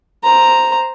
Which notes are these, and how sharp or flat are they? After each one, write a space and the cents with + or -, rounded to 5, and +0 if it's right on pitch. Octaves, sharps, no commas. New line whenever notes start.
C5 +0 A#5 +0